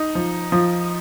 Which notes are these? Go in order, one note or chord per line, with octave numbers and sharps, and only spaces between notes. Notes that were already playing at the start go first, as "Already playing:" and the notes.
Already playing: D#4
F3
F3